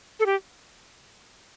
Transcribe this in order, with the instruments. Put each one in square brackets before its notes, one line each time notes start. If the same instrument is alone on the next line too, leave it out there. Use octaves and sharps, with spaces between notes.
[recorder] A4
G4